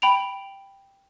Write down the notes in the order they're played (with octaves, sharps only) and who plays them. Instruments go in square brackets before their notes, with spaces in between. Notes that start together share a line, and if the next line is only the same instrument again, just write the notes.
[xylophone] G5 B5 D7 F7